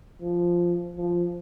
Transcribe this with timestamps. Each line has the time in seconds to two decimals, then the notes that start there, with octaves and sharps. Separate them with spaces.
0.21 F3
0.96 F3